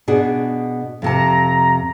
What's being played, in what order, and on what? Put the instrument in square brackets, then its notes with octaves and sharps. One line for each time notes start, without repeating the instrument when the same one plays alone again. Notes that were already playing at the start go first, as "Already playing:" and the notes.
[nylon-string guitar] B2 D4 G#4
[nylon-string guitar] F2 C3 A5 [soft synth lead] A#5